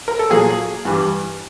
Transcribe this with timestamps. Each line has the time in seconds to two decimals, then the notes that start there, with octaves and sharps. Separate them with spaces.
0.08 A#4
0.19 A4
0.30 A#2 F#3 A#3 G#4
0.85 G2 E3 G3